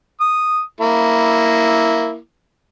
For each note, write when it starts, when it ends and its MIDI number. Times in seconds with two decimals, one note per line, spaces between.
0.21 0.61 87
0.80 2.17 58
0.80 2.17 64